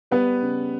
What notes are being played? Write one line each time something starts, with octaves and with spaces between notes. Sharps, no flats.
G3 B3 B4
C#3